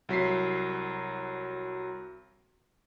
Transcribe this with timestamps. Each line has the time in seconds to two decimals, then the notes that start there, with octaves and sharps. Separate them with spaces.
0.09 C2 F#3 B6 C7